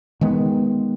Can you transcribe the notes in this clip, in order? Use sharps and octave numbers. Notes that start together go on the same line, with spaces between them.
D#3 G#3 B3